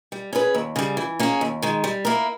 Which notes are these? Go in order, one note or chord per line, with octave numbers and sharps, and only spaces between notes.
G3
C#4 G#4 B4
D#2
C#3 G3
E3
A#3 C#4 G#4
D#2
D#3 G#3
G3
A#3 E4 A#4